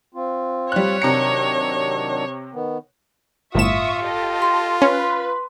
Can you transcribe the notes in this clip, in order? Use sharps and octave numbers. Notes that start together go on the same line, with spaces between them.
C4 F4
G3 C#5 F#6
C3 D#3 F#3 D4 A#5 C#7
D#3 B3
G1 A2 F4 E5 C#6 D#6 E7
G4 A4 D#5
C6
C#4 B4